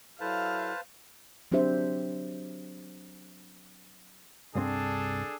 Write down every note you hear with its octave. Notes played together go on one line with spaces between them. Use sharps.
F#3 E4 A4 B4 C5 F5 A5
F#3 C4 D4 G4 C5 E5
C2 G2 C4 D4 G#4 A4